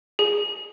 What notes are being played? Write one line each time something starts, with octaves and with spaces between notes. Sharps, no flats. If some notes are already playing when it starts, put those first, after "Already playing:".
G#4